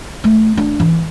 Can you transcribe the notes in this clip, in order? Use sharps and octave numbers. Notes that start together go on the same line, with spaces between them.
A3
D4
E3